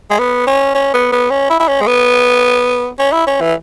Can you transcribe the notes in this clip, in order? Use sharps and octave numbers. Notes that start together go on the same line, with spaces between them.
G#3
B3
C#4
C#4
B3
B3
C#4
E4
E4
C#4
G#3
B3
C#4
E4
C#4
E3